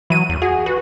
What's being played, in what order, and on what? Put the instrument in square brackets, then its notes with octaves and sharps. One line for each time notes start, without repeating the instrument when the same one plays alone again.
[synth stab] E3 D#7 [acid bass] F#3
[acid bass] E2
[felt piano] F#4 [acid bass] G#4
[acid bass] F#4 [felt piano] B4